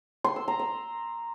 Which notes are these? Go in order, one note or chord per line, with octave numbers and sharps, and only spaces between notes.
C6
E6
A#5
E6